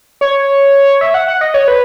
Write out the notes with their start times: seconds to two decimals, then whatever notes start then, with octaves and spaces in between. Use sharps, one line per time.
0.21 C#5
1.01 E5
1.14 F#5
1.28 F#5
1.41 D#5
1.54 C#5
1.68 B4